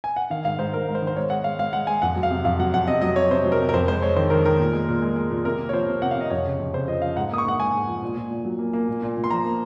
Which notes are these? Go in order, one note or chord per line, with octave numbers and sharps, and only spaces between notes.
G#5
F#5
D#3 F5
G#2 F5
G#2 C5
G#2 A#4
G#2
C5
D#3
C5
G#3 C#5
G#3 F#5
G#3 F5
G#3 F5
G#3 F#5
G#3 G#5
F2 F#5
F#3
F5
C3
F2 F5
F#3 F#5
F2 F#5
C3 D#5
F#3 D#5
C3 C#5
C3 C5
F#3
A#4
C3
A#4
F2 C5
G#3 C5
G#3 C#5
D#3 C5
D#3 A#4
D#3 A#4
A#2
G#3
A#2
G#3
G#3
A#2
C3 A#4
A#3
C#5
F3 C5
C3
C3 F#5
F5
C3 D#5
F2 C#5
C#3
F2
C#3 C5
F3 D#5
F3 F5
G#2 F#5
A#3 D#6
C#6
G#2 F#5
G#2 G#5
G#2
F3
A#2
A#2
A#2
F#3
A#3
A#3
A#2
A#2
A#2
C6
F3 A#5
A#3